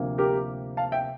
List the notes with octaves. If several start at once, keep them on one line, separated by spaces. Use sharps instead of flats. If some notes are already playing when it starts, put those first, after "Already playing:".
Already playing: D2 C3 F3 A#3
G4 A#4
F5 A5
E5 G5